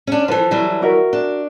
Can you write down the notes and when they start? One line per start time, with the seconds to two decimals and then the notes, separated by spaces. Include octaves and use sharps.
0.07 C#4 D4
0.28 E3 F3 A4 B4 C5
0.51 E3 F#3 G3
0.82 F#4 A#4 E5
1.13 D4